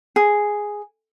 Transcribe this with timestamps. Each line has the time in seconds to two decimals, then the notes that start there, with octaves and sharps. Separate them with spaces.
0.16 G#4